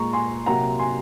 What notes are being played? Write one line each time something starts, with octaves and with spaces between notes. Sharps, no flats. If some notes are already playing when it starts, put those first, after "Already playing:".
Already playing: A#2 G#3 A#5 C#6
G#5 C6
C3 F#3 A#3 F#5 A#5
G#5 C6